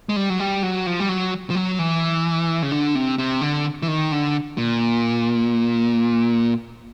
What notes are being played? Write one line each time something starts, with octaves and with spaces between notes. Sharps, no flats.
G#3
G3
F#3
G3
F#3
F3
G3
F#3
F3
F#3
E3
C#3
D3
C3
C3
D3
E3
D#3
D3
A#2